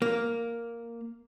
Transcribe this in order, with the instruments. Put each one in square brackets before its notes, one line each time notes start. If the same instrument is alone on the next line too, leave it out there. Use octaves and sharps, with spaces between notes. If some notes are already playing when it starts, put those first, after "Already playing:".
[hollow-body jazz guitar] A#3